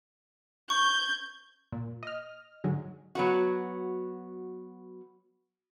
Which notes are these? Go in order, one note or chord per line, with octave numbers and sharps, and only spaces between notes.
C#6 G6 G#6
A#2
D#5 F6
G#2 D3 F#3 G#3
F#3 B3 F#4